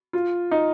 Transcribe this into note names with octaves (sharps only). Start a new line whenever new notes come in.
F4
D#4